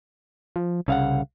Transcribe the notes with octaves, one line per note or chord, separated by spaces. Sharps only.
F3
C2 C#3 F5 F#5